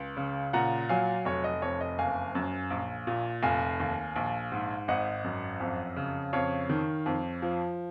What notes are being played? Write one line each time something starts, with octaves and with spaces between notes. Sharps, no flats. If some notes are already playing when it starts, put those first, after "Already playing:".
Already playing: C#2
C#3
A#2 F#5 A#5
F#3 F5 G#5
F1 C#5
D#5
F2 C#5
D#5
F#1 F5 G#5
F#2
A#1
A#2
F1 F5 G#5
D#2
A#1
G#2
G#1 D#5 F#5
F#2
F2
C#3
F2 C#5 F5
D#3
F2
F3